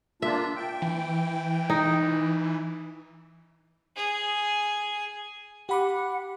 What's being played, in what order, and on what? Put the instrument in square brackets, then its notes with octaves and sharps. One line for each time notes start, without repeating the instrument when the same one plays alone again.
[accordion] A#3 D4 F4 [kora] E5
[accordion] G5
[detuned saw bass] E3
[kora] D#4
[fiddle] G#4
[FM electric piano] G4 B5 D6 [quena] F#5